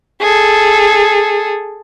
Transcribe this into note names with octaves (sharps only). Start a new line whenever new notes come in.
G#4 A4